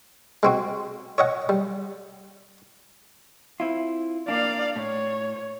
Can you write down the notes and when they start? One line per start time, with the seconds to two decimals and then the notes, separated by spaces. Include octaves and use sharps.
0.43 G#3 C4 F#4
1.18 C#5 D#5 F#5
1.49 G3
3.60 C4 E4 F4
4.28 A#3 D4 D5 F5
4.76 A2 C#5